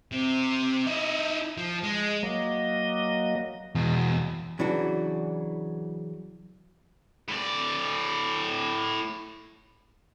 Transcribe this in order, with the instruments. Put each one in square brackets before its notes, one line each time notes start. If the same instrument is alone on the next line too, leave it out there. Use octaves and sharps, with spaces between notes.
[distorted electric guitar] C3
D#4 E4
F3
G#3
[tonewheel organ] F#3 A#3 D#5
[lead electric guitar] E2 B2
[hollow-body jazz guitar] C#3 E3 F#3 D4 F#4
[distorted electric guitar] A2 D5